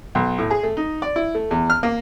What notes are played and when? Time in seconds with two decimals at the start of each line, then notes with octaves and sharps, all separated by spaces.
0.15 B1
0.38 A2
0.50 G#4
0.63 A3
0.77 D#4
1.02 D5
1.16 E4
1.35 A3
1.51 E2
1.70 F6
1.83 A#3